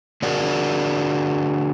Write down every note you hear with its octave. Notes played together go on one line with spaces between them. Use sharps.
D3 D4 F#4 G#4 A#4